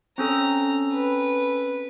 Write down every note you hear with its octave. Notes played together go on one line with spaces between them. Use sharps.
C4 C#4 A4 A#5
B4